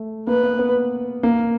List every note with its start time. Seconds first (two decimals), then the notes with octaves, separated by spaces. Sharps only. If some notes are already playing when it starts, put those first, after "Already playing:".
Already playing: A3
0.27 A#3 B4
0.43 B3
0.59 B3
1.23 A#3